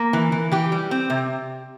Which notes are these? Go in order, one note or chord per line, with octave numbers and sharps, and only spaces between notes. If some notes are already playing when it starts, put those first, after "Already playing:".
Already playing: A#3
E3
E3
E3 G4
G3
C4
C3